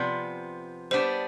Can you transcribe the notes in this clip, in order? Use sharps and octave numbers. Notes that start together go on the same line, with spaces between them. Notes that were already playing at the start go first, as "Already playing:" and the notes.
Already playing: C3 F3 B3 D5
G3 B3 D4 C5